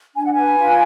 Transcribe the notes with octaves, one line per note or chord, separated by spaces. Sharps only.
D4 G#5
F#5
B4 G#5
F4